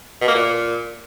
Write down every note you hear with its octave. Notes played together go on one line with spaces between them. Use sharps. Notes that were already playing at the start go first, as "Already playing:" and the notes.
B2
A#3
A#2